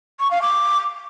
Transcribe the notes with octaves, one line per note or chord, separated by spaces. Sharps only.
C#6
F5
D6